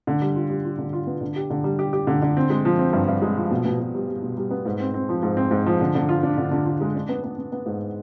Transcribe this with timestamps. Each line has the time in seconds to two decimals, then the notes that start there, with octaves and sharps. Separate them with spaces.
0.07 D3
0.22 G3
0.35 F4
0.50 G3
0.64 F4
0.78 D3
0.93 F4
1.07 B3
1.21 D3
1.36 G4
1.50 D3
1.64 G3
1.79 G4
1.93 G4
2.07 D3
2.22 D3
2.37 C4
2.50 G#3
2.65 F3
2.79 C4
2.93 G2
3.08 G2
3.22 G#3
3.37 F3
3.51 B2
3.66 B2
3.80 B2
3.94 G3
4.09 G3
4.23 B2
4.37 G3
4.51 B3
4.65 G#2
4.80 C4
4.94 C4
5.09 F3
5.23 G#2
5.37 C4
5.51 G#2
5.66 F3
5.81 D3
5.95 D3
6.09 F4
6.23 D4
6.38 D3
6.51 D3
6.66 F4
6.81 G#3
6.95 D4
7.09 B3
7.24 B3
7.38 B3
7.52 B3
7.66 G#2